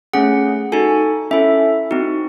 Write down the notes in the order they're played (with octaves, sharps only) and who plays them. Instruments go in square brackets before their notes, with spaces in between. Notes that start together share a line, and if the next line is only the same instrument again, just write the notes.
[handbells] A3 C#4 G#4 F#5
D#4 F#4 A4 G#5
C#4 E4 A4 E5
C4 D#4 F#4